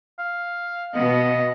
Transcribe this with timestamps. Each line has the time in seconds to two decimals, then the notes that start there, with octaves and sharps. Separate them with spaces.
0.19 F5
0.95 B2 B3 D#5